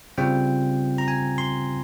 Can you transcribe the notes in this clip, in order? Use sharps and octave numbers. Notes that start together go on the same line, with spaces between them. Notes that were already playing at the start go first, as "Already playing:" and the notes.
C#3 G3 C4 F4 G5
A#5
G#5
C6